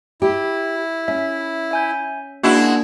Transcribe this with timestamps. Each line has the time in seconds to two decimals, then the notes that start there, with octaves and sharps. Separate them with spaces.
0.22 E4 G4
1.08 C#4 E5
1.71 E5 G#5 G6
2.43 G#3 A#3 D4 E4 F#4 G#6